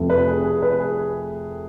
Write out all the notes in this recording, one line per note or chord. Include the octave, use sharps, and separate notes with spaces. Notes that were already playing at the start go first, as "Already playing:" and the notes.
Already playing: F1 F2 C3 F3 A3
B4
G#4
G#4
B4
G#4